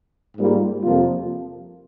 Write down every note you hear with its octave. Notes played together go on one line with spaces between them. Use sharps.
G#2 G3 A#3 F4
F2 C3 F3 A#3 F4